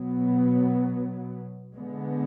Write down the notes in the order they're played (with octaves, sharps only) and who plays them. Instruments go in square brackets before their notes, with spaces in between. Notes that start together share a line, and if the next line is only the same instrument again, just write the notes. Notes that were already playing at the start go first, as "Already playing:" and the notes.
Already playing: [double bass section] B2 F#3 B3
D3 G#3 B3